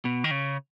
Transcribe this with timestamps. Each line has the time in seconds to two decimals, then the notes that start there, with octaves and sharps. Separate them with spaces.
0.05 B2
0.24 D#3
0.31 C#3